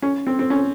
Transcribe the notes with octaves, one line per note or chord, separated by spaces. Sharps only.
C#4
C4
C4
C#4